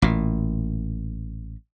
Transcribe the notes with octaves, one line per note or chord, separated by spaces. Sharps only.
A1 A#2